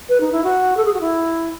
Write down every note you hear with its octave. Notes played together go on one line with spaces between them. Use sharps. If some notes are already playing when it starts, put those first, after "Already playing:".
B4
D#4
E4
F#4
A4
G#4
F#4
E4